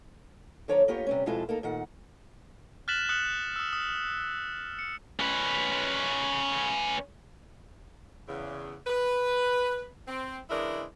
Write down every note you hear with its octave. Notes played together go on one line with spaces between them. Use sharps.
D3 F3 C#5 D5 A#5
A#3 B3 F4 G4 C#5
C3 G3 C#4
F2 B2 G#3 E4 F4 A4
A#3 D#4 A4
A#2 D#3 F#5
F6 F#6 A6 B6 E7 F#7
D#6 F#6 C#7 F#7
D#6 E6
D#6
C#7
C#4 B4
E2 C#3
B4
C4
C#3 E3 G#3 D4 E4 A#4